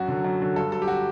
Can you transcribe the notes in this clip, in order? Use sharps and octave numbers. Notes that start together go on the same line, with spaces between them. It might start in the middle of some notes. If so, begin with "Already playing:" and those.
Already playing: F#2 F#4
D3 F#3
F#2
D3 F#3
G2 A4
F#3 A4
G4
F#4